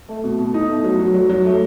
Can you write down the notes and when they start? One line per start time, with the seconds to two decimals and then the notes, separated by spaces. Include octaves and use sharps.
0.09 A3
0.24 B2
0.39 B2
0.54 D#4
0.69 A3
0.84 F#3
0.99 F#3
1.14 F#3
1.29 F#3
1.45 A3